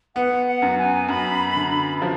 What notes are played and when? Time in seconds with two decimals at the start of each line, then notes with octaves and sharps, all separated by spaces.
0.15 B3 F#5
0.46 F#5
0.62 F#2
0.78 G#5
1.08 F#2 B5
1.56 D3
2.02 F3